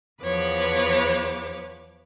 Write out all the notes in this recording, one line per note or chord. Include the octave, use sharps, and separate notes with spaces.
E2 F3 B4 C#5 D6